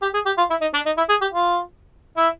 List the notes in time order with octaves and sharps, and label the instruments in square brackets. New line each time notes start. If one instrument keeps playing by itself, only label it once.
[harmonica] G4
G#4
G4
F4
E4
D#4
D4
D#4
E4
G#4
G4
F4
E4